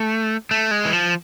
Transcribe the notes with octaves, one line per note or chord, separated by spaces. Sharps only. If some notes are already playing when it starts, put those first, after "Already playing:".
Already playing: A3
A3
G#3
E3
F3